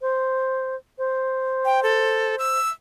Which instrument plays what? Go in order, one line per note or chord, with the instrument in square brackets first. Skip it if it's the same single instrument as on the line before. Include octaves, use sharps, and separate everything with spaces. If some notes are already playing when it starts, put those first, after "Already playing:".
[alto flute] C5
C5
[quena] G5
A4
E6